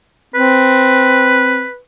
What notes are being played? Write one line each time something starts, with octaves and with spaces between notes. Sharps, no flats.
C4 B4